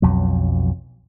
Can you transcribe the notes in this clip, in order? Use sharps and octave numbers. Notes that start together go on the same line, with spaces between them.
B1 F2 F#3